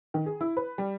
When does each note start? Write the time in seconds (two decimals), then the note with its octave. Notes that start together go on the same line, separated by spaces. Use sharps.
0.14 D#3
0.26 G#4
0.41 E4
0.57 B4
0.78 G3